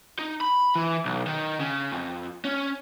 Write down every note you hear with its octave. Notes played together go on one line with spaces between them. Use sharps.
D#4
B5
E3
B1
D#3
C#3
F2
C#4